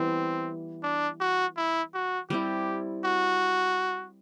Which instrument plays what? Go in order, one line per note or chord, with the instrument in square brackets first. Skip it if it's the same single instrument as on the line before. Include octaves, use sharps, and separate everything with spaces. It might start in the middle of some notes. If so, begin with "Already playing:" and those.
Already playing: [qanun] E3 G3 B3 [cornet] C4
[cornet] D4
F#4
E4
F#4
[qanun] G3 C4 E4 [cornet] G4
[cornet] F#4